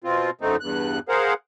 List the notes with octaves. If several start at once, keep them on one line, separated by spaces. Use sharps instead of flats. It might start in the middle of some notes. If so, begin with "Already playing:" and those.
B2 C4 F4
F#2 D3 A3 C4 D#4
E2 G2 F#6
G#4 A#4 C5 F5 F#5